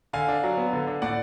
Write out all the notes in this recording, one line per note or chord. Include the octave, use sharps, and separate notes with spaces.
D3 F5 G#5
D4
F#3
B3
D3
D4
A2 D5 F#5